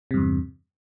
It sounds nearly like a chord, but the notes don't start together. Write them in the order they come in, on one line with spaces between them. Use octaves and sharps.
C3 G2 E2